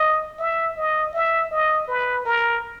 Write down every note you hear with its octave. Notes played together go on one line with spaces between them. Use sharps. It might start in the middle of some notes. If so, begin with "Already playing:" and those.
Already playing: D#5
E5
D#5
E5
D#5
B4
A#4